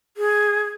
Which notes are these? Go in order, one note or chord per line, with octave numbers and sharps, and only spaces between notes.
G#4